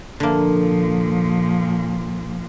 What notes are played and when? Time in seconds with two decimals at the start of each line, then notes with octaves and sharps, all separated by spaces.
0.20 A#2 D3 F3 A#3